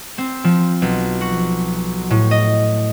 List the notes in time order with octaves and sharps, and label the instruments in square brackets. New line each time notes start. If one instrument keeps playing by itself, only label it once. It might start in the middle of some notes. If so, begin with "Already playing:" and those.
[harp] C4
F3
B1
F#4
A2
D#5